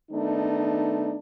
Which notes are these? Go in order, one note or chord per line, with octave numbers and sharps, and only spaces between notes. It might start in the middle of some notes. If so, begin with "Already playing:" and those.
D#3 A3 B3 D4 D#4